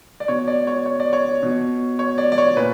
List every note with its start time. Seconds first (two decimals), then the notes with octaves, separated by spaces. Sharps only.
0.20 D5
0.28 B2 C#5
0.48 D5
0.67 C#5
0.86 C#5
1.00 D5
1.13 C#5
1.43 B2
1.99 C#5
2.18 D5
2.32 D5
2.38 C#5
2.56 A#2 B4